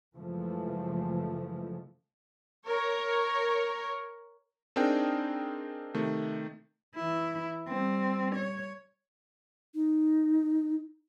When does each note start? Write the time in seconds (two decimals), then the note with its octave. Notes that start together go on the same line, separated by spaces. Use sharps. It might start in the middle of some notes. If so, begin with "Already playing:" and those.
0.15 F#2 C#3 E3 F3 G#3 A3
2.65 A#4 C#5
4.76 C4 D4 D#4 G#4 A#4 G5
5.94 C3 D#3 A3
6.96 E3 E4
7.68 G3 C4
8.36 C#5
9.75 D#4